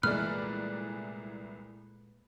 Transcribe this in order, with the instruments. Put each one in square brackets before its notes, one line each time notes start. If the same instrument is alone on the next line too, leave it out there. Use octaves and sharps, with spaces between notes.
[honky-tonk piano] C2 E3 D5 [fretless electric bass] A#2 G#3 A3 [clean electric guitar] B4 [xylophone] F6